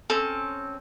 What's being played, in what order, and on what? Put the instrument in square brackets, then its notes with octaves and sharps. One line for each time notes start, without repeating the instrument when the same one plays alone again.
[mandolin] C4 C#4 [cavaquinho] A4